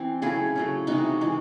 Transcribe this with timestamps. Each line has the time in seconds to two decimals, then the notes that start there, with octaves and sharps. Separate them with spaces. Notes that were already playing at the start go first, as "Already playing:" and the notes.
Already playing: E3 C4
0.22 C#3 F#3 A3 E4 G#4
0.56 C#3 F#3 A3
0.87 C3 E3 G#3 D#4 F#4
1.21 C3 E3 G#3